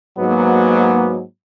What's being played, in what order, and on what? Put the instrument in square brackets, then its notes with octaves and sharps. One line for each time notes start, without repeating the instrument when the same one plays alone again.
[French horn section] G#2 F#3 [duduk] A#3 [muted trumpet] B3